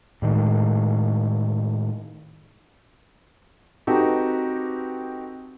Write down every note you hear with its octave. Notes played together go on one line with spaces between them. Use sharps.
A2 D#3 G#3
C4 D#4 F#4 G4 A4 B4